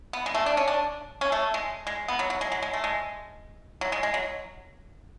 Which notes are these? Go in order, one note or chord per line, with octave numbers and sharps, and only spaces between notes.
B3
G#3
A3
D4
C#4
D4
C#4
A3
G#3
G#3
B3
F#3
F#3
G#3
F#3
G#3
A3
G#3
F#3
G#3
G#3
F#3